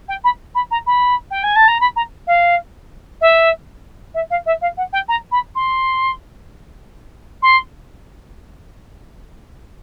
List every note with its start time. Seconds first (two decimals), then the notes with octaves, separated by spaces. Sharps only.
0.08 G5
0.24 B5
0.55 B5
0.71 A#5
0.86 B5
1.31 G5
1.43 G#5
1.56 A5
1.68 A#5
1.80 B5
1.96 A#5
2.27 F5
3.21 E5
4.14 E5
4.30 F5
4.46 E5
4.61 F5
4.77 F#5
4.93 G5
5.08 A#5
5.31 B5
5.55 C6
7.42 C6